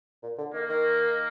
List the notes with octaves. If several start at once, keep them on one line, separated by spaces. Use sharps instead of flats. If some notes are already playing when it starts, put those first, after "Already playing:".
A#2
D3
D#3 A#3
D#3